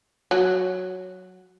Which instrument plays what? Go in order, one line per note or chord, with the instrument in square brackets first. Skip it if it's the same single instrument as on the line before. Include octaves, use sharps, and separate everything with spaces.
[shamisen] F#3